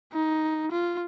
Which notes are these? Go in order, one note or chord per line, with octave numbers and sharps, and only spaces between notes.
D#4
F4